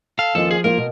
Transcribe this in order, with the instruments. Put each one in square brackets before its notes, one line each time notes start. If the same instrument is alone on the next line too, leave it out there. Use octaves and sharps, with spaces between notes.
[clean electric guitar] A4 [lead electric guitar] F5
[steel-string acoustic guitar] D#2 C#4 F4 [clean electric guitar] F3 [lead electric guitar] A4
[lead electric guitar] G#4
[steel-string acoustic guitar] A#3 F4 [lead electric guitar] A#4
[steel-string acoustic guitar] B2